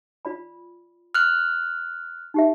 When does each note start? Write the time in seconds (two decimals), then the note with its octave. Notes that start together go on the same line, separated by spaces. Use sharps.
0.25 F4 D5 B5
1.14 F6 F#6
2.34 D#4 G4 E5